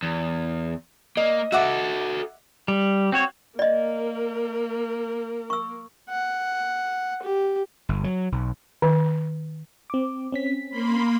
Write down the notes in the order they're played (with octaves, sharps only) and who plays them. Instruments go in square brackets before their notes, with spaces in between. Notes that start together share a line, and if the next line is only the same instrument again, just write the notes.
[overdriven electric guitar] E2
[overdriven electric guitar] A#3 [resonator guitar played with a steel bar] D#5
[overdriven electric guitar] F#4 A4 [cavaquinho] E5 F#5 D6
[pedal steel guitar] G3
C4 F#4 C#5
[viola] A#3 A#4 [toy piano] D5 D#5
[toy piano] C#6 E6
[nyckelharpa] F#5
G4
[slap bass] G1
F#3
B1
[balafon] D#3
[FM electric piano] C4 D6
C4 C#4 B6
[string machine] A#3 B5 C6